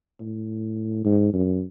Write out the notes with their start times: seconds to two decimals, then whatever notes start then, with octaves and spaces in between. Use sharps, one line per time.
0.20 A2
1.04 G#2
1.33 F#2